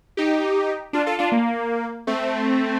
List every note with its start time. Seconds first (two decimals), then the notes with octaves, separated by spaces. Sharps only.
0.17 D#4 G4
0.93 D4 F4
1.06 F4 A4
1.19 D4 F4
1.32 A#3
2.07 A3 C4